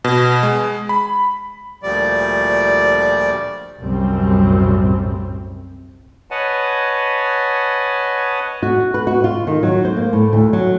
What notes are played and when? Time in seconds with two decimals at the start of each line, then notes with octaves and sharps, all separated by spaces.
0.04 B2
0.43 G#3
0.89 B5
1.83 D2 A#2 F3 G3 D5
3.80 C2 F#2 A2 G3 C4
6.31 B4 C#5 D#5 F#5 G#5 A5
8.63 F#4
8.94 B4
9.07 F#4
9.24 F4
9.47 D#3
9.63 F#3
9.85 C5
9.97 A#3
10.13 A2
10.33 D2
10.53 F#3